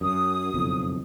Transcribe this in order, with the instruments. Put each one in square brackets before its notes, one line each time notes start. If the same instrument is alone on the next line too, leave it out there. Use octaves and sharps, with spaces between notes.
[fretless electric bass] F#2 [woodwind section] D#6
[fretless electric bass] F#1 B1 F2